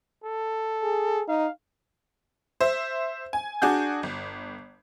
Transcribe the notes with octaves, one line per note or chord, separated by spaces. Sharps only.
A4
G#4
D#4 F5
C5 E5
G#5
D4 F#4 G#4 G6
G1